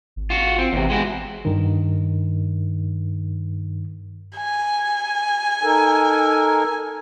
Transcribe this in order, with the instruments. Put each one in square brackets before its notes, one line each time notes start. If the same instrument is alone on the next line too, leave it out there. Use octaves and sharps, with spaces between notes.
[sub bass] G#1
[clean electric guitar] F4 F#4
C4
[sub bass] G#1 [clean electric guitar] E2 C3
[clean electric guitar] G#3 E4 F#4
[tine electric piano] G2 D#3
[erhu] G#5
[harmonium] D#4 A4 A#4